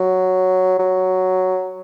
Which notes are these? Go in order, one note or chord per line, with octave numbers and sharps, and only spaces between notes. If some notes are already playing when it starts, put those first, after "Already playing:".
Already playing: F#3
F#3